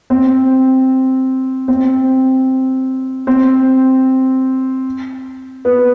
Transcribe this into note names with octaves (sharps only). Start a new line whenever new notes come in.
C4
C4
C4
B3